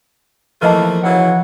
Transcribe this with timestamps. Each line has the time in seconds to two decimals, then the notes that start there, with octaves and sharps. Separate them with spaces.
0.62 E3 F3 A3 A#3 B4 D#5 A5
1.04 C#3 E3 F#3 F#5